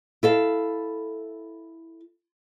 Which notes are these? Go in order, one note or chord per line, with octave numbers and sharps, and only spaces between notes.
E4 A4 F5